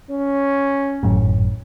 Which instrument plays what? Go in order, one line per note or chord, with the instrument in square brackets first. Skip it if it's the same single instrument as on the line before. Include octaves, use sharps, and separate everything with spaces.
[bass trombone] C#4
[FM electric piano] G#1 F#2 A2